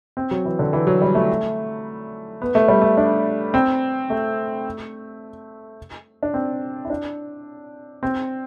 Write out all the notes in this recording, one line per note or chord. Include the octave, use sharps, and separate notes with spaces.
C4
F#3
E3
D3
E3
F#3
G3
A3
B3
A3
G3
A3
D4
C4
A3
D4
C4
E4
D4
C4